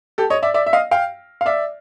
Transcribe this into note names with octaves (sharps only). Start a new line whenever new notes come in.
G4 A4
C#5 D#5
D5 E5
D5 E5
E5
D#5 F5
F5 G5
F5
D5 E5